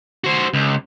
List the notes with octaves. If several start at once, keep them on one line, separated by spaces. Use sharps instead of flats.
F#4 C5
C#2